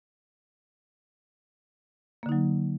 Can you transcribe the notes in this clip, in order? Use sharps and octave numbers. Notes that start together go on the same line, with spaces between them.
D3 F#3 A#3 D#4